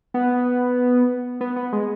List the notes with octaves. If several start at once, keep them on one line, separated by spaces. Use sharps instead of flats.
B3
B3
B3
G#3